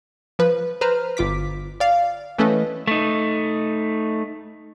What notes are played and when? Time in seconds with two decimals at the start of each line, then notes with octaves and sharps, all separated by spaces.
0.39 F3 B4
0.81 B4 C5 A#5 F6
1.17 G1 F4 D6 B6
1.80 D5 F5
2.38 E3 A3 C#4 A4 B4 D#5
2.87 A3 D#4